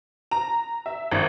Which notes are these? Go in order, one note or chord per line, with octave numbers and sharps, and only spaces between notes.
A#5
E5
G#1